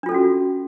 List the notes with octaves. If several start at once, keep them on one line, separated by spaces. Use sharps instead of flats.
C#4 D4 F4 F#4 A4